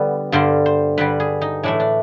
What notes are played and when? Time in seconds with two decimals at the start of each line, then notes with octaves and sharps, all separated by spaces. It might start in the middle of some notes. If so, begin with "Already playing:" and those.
Already playing: D3 G3 B3
0.32 G2 D3 G3 C5
0.66 C5
0.98 G2 D3 G3 B4
1.20 G#4
1.41 D#4
1.63 A2 E3 A3 D4
1.80 D4